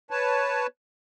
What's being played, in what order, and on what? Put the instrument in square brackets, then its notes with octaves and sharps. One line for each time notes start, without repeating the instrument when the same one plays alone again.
[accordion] B4 C#5 A5